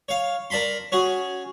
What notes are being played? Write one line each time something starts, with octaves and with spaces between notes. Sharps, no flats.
C#5 F5
A#4 D5 A5 B5 C6
C#4 F#4 G#4